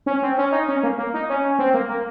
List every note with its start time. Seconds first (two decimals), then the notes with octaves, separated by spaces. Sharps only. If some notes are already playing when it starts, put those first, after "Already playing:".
0.06 C#4
0.22 C4
0.38 C#4
0.52 D#4
0.69 C#4
0.83 A#3
0.98 A#3
1.14 D#4
1.29 C#4
1.59 C4
1.74 A#3
1.89 A#3